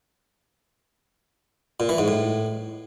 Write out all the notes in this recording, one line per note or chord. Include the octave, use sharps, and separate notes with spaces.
A#2
E3
G#2
A2